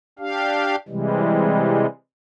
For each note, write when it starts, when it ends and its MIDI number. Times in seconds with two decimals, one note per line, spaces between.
0.19 0.76 62
0.19 0.76 67
0.19 0.76 77
0.88 1.86 48
0.88 1.86 52
0.88 1.86 55
0.88 1.86 56